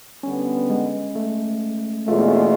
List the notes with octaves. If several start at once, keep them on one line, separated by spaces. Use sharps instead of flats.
D3 G3 B3 C#4
G#3
A3
E2 B2 G#3 A3 C#4 F4
A#3
A3